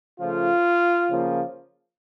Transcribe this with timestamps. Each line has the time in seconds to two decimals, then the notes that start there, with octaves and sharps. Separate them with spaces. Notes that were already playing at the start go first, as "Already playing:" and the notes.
0.20 C#3 F3 A3 F4
1.10 C#3 F3 A#3